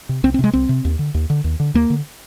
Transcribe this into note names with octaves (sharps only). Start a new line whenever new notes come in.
C3
C2 C4
C4
C3 G#3
C2 C4
C3
D#2
D3
D#2
D3
D#2
D3
D#2 A#3
D3